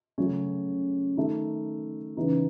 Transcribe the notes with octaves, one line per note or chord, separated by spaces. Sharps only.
C#3 F#3 A3 C#4
D#3 A3 D#4
C#3 E3 B3 D#4